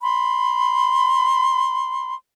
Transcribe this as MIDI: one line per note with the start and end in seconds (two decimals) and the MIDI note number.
0.02 2.14 83
0.02 2.14 84